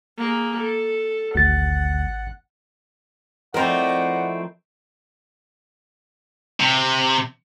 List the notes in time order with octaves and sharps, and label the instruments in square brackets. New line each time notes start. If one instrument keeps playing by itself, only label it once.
[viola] A#3 G#4
A4
[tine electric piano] G#1 A6 [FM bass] D2 [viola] F#5
[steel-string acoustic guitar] F3 E4 [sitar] A3 C4 A#4 [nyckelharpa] D5 D#5 [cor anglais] F#5
[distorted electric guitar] C3